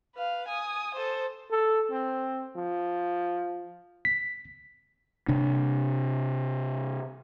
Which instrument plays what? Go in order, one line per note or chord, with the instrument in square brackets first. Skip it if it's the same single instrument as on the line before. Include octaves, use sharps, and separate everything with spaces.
[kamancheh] B4 F5
G#5 D#6
A4 C5
[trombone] A4
C4
F3
[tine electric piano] B6
[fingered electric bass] C3 D4